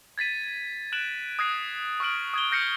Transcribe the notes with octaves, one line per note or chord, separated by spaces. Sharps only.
G#6 A6 B6 D#7
F#6 D7 E7 F#7
D#6 F#6 G#6 A#6 C7
C#6 D#6 F6 D7 F#7
D#6 G#6 G7
F6 G6 A#6 C7 C#7